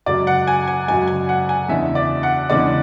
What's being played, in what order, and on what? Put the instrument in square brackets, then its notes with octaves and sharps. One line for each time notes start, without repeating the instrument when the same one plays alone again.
[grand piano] F#2 C#3 G#3 [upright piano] D5
[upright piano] F#5
G#5
G#5
[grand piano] F#2 C#3 G#3 [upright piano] G#5
[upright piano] G#5
F#5
G#5
[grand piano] E2 C#3 G#3 D4 [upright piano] E5
[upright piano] D5
F#5
[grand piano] E2 C#3 G#3 D4 [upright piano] D5